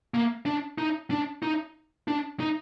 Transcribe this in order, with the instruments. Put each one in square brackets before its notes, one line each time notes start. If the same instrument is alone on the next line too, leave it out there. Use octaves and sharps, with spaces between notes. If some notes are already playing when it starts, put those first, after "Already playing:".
[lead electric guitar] A#3
D4
D#4
D4
D#4
D4
D#4